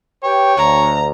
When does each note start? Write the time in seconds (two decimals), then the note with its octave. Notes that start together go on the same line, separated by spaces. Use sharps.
0.23 G4 B4 C#5 G5
0.57 D2 A#5